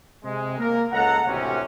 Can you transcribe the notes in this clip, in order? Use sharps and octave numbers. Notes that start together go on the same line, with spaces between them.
C3 G#3
A#3 A#4
C#2 A4 F#5 A#5
A1 D2 C3 C#4